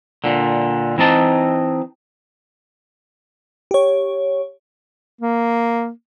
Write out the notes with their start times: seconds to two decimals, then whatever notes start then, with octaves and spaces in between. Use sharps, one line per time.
0.24 A#2 D3
0.98 E3 C4 D#4 A5
3.71 G4 C#5
5.21 A#3